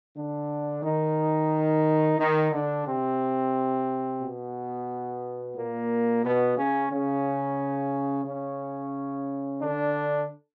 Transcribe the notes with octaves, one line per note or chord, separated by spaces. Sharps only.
D3 D4
D#3 D#4
D#3 D#4
D3 D4
C3 C4
B2 B3
A#2 A#3
B2 B3
C#3 C#4
C#3 C#4
C#3 C#4
D3 D4